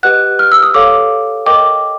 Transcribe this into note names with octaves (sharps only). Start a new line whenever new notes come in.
G4 B4 D#5 F#5 F#6
F6
E6
D#6
A4 C#5 F5 D6
A#4 D#5 G5 D6